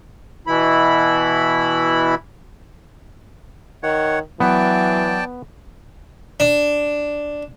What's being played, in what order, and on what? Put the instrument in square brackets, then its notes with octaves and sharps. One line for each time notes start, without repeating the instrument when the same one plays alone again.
[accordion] B2 E3 E4 B5
[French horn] D#3 [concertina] C#5 F#5
[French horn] E3 [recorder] F#3 [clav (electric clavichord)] B3 [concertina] D5 G5 A5
[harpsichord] D4